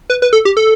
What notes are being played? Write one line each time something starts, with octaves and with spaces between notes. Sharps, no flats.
B4
B4
A4
G4
A4